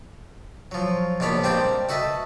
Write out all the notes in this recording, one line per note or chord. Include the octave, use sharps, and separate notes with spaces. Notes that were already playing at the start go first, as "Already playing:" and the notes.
F3 F#3
A#1 B2 D4 C#5 B5
G3 A#3 C4 D4 G4 C5
F#4 A4 B4 D#5 E5